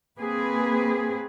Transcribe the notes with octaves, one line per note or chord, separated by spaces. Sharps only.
A#3 C4 G#4 B4